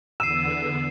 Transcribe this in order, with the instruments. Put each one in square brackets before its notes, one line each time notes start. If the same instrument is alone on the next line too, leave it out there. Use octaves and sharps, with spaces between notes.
[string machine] E2 D3 B3 [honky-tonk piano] E6 [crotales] C7 D#7 E7